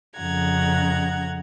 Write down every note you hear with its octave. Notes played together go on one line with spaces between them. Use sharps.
F2 C#3 F#5 A#5 G#6